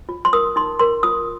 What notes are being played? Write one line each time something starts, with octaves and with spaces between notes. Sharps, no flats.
F4
C6
A#4 D#6
D#4 C6
A#4 C6
F4 D#6